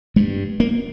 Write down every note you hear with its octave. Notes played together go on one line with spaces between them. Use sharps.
G2 G#3
A#3